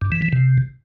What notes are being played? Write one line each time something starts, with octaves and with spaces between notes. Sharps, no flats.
G2
E3
E3
C3